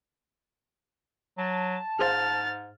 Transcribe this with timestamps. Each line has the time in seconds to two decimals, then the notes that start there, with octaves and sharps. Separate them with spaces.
1.38 F#3 A5
1.99 G#2 G#4 C5 F5 F6 A6